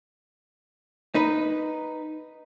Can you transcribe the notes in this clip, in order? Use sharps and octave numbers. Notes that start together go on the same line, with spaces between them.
D#4 B4